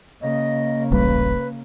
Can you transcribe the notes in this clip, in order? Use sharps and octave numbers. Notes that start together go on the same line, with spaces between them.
C#3 A#3 D#5
D1 A1 G3 B4